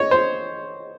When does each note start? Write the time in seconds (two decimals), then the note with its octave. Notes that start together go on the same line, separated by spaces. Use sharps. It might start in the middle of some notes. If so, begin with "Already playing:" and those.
Already playing: C#5 D#5
0.11 C5